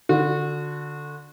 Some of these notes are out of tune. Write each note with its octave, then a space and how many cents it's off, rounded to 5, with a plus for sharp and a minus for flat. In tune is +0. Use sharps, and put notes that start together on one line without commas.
D3 +5 F#4 -25